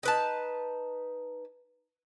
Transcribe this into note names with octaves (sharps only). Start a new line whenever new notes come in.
D#4 B4 A5